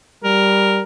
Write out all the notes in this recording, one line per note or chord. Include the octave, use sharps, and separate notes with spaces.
G3 A#4